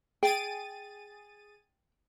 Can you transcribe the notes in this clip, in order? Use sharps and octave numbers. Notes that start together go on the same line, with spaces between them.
G#4 G5 A6 D#7